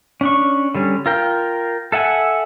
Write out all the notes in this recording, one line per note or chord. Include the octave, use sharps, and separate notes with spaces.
C#4 D4 C#6
D3 G3 C#4
F4 A#4 G5
A4 E5 F#5 G#5